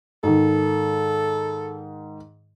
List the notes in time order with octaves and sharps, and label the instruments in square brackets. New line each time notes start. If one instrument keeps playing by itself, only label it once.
[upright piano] G#2 D#3 [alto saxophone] A4